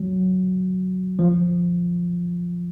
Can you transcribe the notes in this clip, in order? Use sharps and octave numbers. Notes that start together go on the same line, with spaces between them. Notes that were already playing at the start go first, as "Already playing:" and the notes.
Already playing: F#3
F3